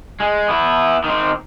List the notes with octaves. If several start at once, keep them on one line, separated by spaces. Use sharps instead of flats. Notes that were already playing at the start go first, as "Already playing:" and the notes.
G#3
B3 E4
D#3 C4